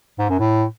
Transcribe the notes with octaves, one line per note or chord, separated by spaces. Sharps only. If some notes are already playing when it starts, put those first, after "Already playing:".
G#2
F#2
A2